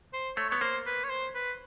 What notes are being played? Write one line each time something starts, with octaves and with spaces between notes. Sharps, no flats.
C5
A3 C#5
B3 C#5
A#3 C5
B4
C#5
C5
B4